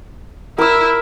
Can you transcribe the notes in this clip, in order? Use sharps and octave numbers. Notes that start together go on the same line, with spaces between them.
E4 A#4 E6